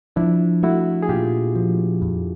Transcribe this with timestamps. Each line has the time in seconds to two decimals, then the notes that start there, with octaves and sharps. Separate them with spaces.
0.16 F3 D4 E4
0.63 A3 E4 F#4
1.03 G#4
1.09 A#2 F4 G4
1.56 F3
2.02 F2